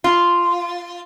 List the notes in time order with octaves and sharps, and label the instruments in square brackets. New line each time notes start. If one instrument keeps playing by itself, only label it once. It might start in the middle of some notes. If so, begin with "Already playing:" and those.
[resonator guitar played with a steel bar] F4